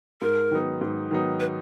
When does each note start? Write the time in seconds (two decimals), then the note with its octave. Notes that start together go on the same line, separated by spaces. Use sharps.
0.22 G#2 A#4
0.51 D#3 F#3 B3 D#4
0.81 G#2
1.11 D#3 F#3 B3 D#4
1.40 B4